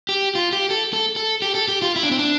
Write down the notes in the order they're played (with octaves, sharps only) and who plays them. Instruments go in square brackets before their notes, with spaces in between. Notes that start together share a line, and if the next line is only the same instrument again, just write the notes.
[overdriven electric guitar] G4
F4
G4
A4
A4
A4
G4
A4
G4
F4
E4
D4
C4
D4